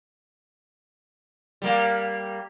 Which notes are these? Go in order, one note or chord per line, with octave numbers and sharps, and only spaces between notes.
G3 A#3